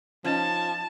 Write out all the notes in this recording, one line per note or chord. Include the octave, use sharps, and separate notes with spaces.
F3 C#4 D#4 A5